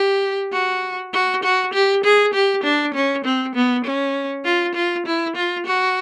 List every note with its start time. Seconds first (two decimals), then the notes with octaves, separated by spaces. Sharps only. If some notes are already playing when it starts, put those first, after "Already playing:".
Already playing: G4
0.52 F#4
1.13 F#4
1.43 F#4
1.73 G4
2.04 G#4
2.34 G4
2.64 D4
2.94 C#4
3.24 C4
3.55 B3
3.85 C#4
4.45 F4
4.75 F4
5.06 E4
5.36 F4
5.66 F#4